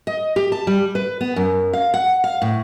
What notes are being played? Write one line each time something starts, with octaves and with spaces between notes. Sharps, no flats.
D#5
G4
A5
G3
B4
B3
F#2
F5
F#5
F5
A2